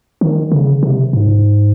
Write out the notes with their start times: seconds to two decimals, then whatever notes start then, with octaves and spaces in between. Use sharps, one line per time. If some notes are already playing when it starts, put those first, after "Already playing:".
0.21 D#3
0.52 C#3
0.83 C3
1.13 G#2